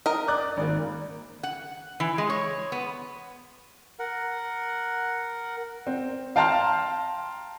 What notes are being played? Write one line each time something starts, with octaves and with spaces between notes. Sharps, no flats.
A#4 D#5
D5 D6 F#6
G#1 A#3
F#5
E3
G#3
C#5
B3
A#4 F#5
C4
F5 G5 A5 A#5 C6 F6